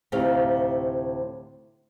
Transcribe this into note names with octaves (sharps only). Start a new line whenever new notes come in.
D2 A2 C3 D#4 G4 F5